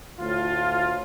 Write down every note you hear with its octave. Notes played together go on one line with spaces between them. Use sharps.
D2 A2 F4